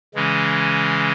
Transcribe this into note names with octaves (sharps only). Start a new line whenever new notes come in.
C#3 E3 G#3 C#4